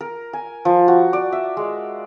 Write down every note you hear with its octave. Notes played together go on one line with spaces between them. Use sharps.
A#4
G#5
F3
F#4
D5
E5
G#3